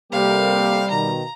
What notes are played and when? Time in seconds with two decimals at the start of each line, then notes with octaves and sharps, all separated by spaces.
0.12 C3 G3 A#3 G4 A4 A#4 F5
0.91 B2 D#3 A#5